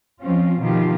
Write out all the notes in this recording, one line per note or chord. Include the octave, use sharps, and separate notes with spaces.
F3 C4 C#4 F4
B2 D#3 F3 F4 G4